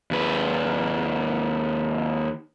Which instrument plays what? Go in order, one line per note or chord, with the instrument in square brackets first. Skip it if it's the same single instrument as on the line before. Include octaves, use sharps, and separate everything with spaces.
[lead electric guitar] D#2 B4